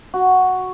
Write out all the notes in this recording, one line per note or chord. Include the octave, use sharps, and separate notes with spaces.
F#4